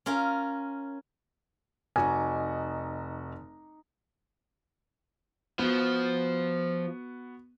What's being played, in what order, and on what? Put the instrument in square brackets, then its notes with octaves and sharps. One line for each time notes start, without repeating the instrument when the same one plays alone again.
[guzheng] C#4 F4 A#4
[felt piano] F1 F#4 C#6 [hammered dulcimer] D#4 D6 [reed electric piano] G#5
[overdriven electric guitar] F3 [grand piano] B3 F#4